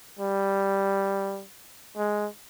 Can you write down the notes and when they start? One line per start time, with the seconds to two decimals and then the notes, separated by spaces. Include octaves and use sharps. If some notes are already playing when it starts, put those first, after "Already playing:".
0.19 G3
1.97 G#3